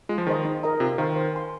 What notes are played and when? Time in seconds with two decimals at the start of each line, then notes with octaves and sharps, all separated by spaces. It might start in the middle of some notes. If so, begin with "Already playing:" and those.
0.09 G#3 F4
0.18 F3
0.27 D#3 G#4 C5 D#5
0.45 D#4
0.63 A#4 D#5 A#5
0.80 C3 F4
0.98 D#3 C5 F5
1.16 C5
1.34 G#5 C6